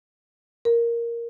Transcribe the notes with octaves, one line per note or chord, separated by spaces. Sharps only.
A#4